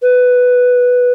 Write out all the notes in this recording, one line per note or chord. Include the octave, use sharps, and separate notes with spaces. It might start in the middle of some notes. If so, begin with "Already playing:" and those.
B4